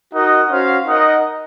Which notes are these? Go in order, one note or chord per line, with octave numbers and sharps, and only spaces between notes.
D#4 F#4 A#4 D#5 F#5
C#4 F#4 C5 F5
D#4 A#4 D#5 F#5